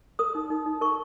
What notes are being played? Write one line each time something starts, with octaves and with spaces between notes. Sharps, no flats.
A#4 D#6
D#4
D#4
D#4
A#4 C#6